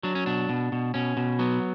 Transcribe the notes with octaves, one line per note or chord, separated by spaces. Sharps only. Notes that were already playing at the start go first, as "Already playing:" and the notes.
F#3 D4
C#4
B2 D4
B2
B2
B2 C#4
B2
F#3 B3